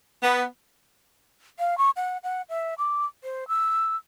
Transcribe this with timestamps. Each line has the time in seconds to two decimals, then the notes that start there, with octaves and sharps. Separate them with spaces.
0.23 B3
1.59 F5
1.78 C#6
1.96 F#5
2.24 F#5
2.49 E5
2.78 D6
3.24 C5
3.48 E6